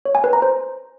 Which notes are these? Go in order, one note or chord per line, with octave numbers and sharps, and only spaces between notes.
C#5
G#5
B4
A#5
C5